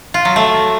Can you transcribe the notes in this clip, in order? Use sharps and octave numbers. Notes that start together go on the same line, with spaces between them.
F4
F#3
A3